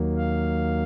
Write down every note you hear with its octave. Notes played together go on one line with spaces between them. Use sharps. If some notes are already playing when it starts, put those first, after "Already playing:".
Already playing: D#2 D#3 F#3 A#3
F5